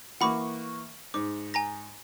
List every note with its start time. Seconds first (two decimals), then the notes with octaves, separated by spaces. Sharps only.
0.21 E3 A#3 F#5 B5 C#6 D6
1.14 G#2 D6
1.54 G#5 A#5 A#6